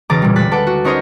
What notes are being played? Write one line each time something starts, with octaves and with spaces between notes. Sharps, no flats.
E1 C#3 A#5 D6 A6
A#2 G3
D2 G#3 F#6 A6 B6
A4 B4 F#5 A5 D6
F#4
C#4 D#4 A#4 C5 C#5 D#5